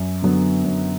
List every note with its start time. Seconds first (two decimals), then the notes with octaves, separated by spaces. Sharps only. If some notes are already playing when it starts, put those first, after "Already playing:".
Already playing: F#2
0.22 D3 F#3 B3
0.64 F#2